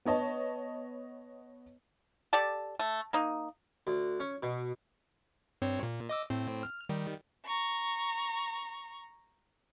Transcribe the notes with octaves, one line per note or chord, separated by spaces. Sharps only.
B3 C#5 D#5 A5
G4 A4 D5 A5
A3
A#3 D#4
D2
C#4
B2
G2 C4 C#5
A#2
D#5 D6 E6
A2 C4
F6
D#3 G3
A#5 C#6